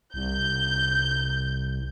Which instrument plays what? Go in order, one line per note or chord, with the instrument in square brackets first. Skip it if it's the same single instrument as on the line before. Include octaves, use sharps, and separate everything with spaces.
[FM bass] C2 [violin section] G6